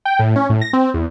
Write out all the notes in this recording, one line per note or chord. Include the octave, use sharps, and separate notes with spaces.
G5
A2
C#4
A2
A#6
C4
E2